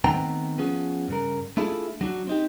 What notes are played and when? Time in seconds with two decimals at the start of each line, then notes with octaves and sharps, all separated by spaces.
0.04 D#3 A3 B3 C4 G5 A#5
0.58 F3 B3 C#4 G#4
1.08 G2 C#3 A#4
1.57 A3 D4 E4 F4 G#4 A4
2.01 F#3 D4 F#4
2.27 C4 D#4 G4